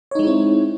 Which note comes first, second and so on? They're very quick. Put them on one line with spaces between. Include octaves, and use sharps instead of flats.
C#5 D#4 G#3 E4 C4